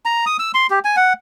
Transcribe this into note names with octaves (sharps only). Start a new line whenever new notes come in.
A#5
D#6
E6
C6
G4
G#5
F#5